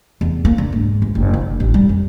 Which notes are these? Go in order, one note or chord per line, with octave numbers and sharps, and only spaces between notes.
E2
A#3
D3
G#2
G1
F#1
D3
A1
G3
F2